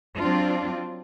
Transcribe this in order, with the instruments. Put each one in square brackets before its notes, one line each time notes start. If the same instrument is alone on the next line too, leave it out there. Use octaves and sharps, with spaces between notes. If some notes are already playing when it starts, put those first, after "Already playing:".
[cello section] F#3 C4 D4 F4